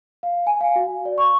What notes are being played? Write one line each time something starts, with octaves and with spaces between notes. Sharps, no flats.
F5
G#5
F5
F#4
D5
C#6